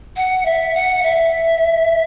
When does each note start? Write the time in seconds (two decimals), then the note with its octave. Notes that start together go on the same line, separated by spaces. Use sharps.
0.17 F#5
0.45 E5
0.74 F#5
1.03 E5